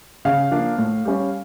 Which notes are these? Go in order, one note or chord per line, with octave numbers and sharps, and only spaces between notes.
C#3 F5
F3 A#3 D4
A2
G3 C#4